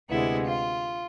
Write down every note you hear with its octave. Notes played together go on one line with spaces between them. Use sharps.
D2 C3 G#3 B3 E4
F4